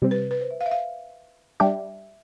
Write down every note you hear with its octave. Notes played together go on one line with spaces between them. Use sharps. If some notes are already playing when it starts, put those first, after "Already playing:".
C3 G3 C4
B4
B4
C5
E5
F5
E5
F5
G3 D4 G4 E5